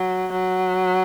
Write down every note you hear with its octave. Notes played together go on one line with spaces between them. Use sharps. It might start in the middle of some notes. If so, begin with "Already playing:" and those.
Already playing: F#3
F#3